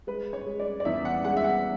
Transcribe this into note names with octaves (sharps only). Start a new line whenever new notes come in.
G#3 B4
C#5
G#3
D5
D5
E2 E5
F#5
G#3 F#5
E5
F#5